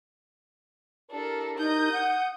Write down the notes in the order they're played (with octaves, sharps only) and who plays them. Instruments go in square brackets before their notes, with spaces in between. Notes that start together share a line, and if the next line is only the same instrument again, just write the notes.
[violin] D4 A4 [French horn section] E4 G4 A#4
[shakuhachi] D#4 [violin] D#6 G6
[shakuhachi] F#5